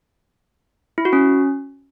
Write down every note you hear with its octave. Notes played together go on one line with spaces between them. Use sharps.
E4
F#4
C#4